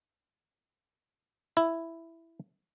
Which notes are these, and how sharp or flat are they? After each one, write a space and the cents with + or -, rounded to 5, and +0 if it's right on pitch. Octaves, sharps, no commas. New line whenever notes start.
E4 +5